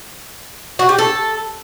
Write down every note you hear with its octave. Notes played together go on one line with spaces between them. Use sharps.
F#4
G4
A4